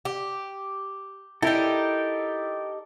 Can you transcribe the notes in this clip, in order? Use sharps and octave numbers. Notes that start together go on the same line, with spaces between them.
G4
D#4 E4 G4 A4 A#4 G5